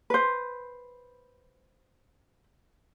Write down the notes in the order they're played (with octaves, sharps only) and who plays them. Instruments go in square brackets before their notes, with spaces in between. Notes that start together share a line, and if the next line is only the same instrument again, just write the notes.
[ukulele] B4 C5